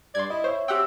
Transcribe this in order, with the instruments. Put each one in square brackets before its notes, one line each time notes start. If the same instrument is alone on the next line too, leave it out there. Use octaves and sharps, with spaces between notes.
[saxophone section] G2 D5 [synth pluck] C6 G#6
[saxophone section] E4 [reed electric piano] D#5
[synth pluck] C5 [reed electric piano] C#5 E5
[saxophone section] C4 [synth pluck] G4 F#5 G5 [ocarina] E6